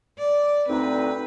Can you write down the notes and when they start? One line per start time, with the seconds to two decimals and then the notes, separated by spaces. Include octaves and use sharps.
0.19 D5
0.69 D2 C4 D#4 B4